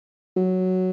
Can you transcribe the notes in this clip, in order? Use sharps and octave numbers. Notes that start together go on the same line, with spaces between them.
F#3